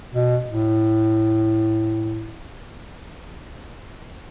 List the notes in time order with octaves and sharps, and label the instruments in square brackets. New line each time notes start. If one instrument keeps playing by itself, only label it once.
[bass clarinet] B2
A2